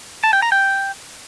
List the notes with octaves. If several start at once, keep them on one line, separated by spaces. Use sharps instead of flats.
A5
G5
A#5
G5